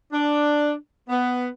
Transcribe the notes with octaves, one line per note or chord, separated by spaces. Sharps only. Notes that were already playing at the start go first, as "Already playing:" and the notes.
D4
B3